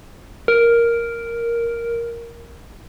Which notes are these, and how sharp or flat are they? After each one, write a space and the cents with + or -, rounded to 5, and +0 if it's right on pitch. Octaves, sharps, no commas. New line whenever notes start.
A#4 +0